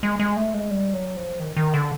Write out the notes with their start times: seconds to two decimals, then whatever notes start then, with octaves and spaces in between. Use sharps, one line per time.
0.03 G#3
0.20 G#3
0.37 A3
0.54 G#3
0.71 G3
0.93 F#3
1.17 F3
1.40 D#3
1.57 D#3
1.74 D3